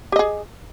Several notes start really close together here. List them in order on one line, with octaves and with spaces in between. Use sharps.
G4 D#5 G#4